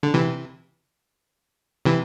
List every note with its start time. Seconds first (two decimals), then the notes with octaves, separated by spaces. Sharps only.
0.03 D3
0.14 C3 E3
1.85 C3 E3